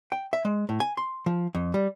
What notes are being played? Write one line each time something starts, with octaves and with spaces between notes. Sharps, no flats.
G5
E5
G#3
A2
G#5
C6
F3
F2
G3